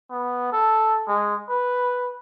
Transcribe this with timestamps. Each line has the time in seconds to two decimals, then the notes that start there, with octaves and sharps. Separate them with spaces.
0.11 B3
0.53 A4
1.08 G#3
1.49 B4